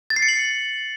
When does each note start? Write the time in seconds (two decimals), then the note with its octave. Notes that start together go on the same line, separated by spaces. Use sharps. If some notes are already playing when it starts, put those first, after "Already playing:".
0.10 A6
0.16 C7
0.22 C#7
0.28 F#7